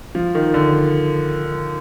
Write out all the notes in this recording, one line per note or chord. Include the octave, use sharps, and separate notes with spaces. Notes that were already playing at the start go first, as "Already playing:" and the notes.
F3
D#3
D3